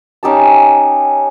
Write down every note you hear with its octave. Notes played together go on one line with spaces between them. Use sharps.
C#4 D#4 G4 A5